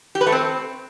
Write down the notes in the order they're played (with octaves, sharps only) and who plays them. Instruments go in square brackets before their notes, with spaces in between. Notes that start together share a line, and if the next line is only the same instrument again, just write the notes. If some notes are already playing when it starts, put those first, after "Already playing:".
[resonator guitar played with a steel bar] G4
B4
A3
C4